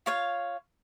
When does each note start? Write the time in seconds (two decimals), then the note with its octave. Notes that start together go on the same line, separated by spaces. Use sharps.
0.06 F4 C#5 F5